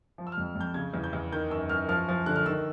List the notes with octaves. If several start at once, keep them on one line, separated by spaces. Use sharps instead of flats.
F3
E6
F6
F2
F2
G6
C#3 G#6
E2
G6
E2
D#3 G6
F#2 E6
F#2 F6
F3 F6
F3
D3 F#6
F6
D#3 E6